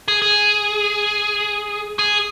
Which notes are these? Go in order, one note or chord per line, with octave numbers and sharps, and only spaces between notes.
G#4
G#4
G#4